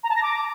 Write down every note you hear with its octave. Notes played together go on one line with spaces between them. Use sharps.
A#5
A5
A#6
D6